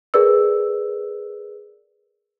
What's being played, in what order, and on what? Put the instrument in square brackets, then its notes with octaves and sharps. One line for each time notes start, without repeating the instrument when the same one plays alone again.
[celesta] G#4 A#4 B4 D5 E6